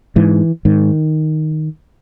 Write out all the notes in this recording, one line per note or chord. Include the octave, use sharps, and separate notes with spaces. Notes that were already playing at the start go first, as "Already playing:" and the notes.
G#2 E3
G#2 D#3